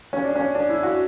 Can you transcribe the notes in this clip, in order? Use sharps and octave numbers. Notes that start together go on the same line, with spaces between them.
C#4
D4
C#4
D4
E4
F#4